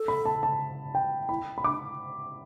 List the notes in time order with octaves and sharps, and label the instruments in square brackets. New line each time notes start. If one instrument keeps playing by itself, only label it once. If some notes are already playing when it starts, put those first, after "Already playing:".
Already playing: [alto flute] A4
[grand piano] B5
A5
A5
G5
[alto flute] E4 [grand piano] B5
[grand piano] B5
[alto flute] D4 [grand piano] D6